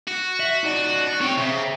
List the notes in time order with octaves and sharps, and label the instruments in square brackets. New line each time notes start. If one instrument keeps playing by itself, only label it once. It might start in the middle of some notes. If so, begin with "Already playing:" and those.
[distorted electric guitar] F#4
[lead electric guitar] E5
D#4 D5
[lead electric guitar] C4 [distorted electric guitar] C#5 G5
[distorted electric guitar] C#3 [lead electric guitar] C5 E5